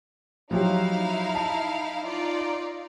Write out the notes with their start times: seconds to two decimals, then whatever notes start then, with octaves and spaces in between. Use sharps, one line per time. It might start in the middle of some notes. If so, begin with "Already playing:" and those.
0.51 F3 F#3 D#4 E4 G4 F5
1.35 A5
2.06 D#4 F4 D5